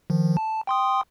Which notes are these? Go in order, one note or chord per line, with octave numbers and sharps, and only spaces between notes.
D#3 F3
A5
G5 C6 D#6